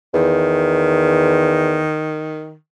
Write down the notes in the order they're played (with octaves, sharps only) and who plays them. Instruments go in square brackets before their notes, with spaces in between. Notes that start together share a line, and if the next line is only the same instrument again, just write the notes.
[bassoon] E2 [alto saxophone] D#3